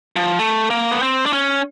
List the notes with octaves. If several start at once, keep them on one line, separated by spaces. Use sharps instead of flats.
F3
A3
A#3
B3
C4
D4
C#4